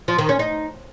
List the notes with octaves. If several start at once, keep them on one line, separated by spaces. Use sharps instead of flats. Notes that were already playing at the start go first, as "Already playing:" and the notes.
F3
D#3
C#4
D#4